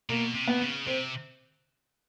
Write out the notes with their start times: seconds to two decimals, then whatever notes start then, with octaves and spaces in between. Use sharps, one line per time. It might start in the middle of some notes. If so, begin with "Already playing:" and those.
0.09 B2 A#3
0.35 C3
0.48 B3
0.62 C#3
0.87 C3 C4